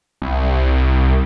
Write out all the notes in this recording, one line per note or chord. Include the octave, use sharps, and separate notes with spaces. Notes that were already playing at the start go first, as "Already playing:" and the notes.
C2